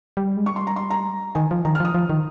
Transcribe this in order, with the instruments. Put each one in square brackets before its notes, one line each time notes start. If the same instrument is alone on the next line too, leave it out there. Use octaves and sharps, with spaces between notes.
[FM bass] G3
G#3
[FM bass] G3 [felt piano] C#6
[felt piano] C6
A#5
C6
A#5
[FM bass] D#3 [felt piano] G#5
[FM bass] F3
[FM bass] D#3 [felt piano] A#5
[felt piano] F6
[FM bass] F3 [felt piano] D#6
[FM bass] F3
D#3